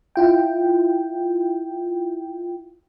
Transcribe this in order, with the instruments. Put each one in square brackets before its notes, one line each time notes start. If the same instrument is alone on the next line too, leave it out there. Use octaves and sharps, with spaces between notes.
[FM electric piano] E4 F4 G5